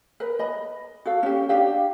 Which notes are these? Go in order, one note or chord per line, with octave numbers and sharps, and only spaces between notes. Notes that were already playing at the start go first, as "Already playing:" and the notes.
A#4 B4
D#5 B5
F#4 A4 F5
C#4 G4
D4 G4 F5